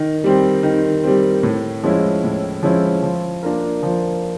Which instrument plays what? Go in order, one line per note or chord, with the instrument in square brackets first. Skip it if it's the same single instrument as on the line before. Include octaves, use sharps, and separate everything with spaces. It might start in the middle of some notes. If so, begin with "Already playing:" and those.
Already playing: [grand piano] D#3
G3 C4
D#3
G3 C4
A2
F3 G#3 C#4 E4
A2
F3 G#3 C#4 E4
F3
A#3 D4 F4 A#4
F3